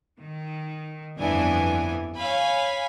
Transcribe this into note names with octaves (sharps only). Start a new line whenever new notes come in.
D#3
G1 F2 E3 B3 D4 G#5
C#5 F5 G#5 B5